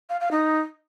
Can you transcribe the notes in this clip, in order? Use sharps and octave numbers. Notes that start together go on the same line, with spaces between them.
F5
F5
D#4